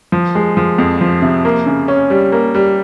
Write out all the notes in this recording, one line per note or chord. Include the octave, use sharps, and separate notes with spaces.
F3
G#3
F3
F2
F3
C3
A#3
C#3
C#4
G3
A#3
G3